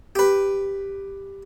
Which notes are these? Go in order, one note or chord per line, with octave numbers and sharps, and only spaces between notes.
G4 B4